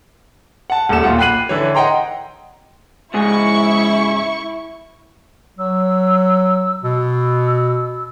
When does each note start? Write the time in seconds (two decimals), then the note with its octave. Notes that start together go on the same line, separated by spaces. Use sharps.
0.70 F#5 A5
0.89 D#1 D2 A4 E7
1.04 B1 A#2 F4 F#5
1.19 G5 B5 F#6 C7 D#7 F#7
1.49 D3 E3 C#5
1.75 D#5 F#5 G5 A#5 C6
3.14 C#2 G#2 E4 G#4 C#6
5.59 F#3 E6
6.83 B2 E6